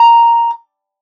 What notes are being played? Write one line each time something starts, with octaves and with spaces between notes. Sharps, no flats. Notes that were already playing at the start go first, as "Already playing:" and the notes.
Already playing: A#5